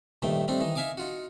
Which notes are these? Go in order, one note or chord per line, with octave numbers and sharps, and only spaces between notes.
A#1 G2 D#3 A3 G5
G3 A3 C4 D4 D#4
D#3 E3 D#4
D#4 E5 F5 G#5 D6 D#6
D#4 F4 F#4